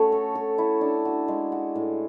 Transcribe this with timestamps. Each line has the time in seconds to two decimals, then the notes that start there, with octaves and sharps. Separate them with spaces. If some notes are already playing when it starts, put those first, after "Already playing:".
Already playing: A3 C#4 F#4 C#5
0.12 A4
0.35 A4
0.58 E4
0.81 D4
1.05 F#4
1.28 G#3
1.52 F#4
1.75 A2